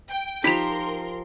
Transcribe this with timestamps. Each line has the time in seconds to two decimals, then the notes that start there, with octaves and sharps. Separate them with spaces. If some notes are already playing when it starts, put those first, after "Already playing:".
0.10 G5
0.44 F3 D#4 G4 A#4 B5 C6 B6 F7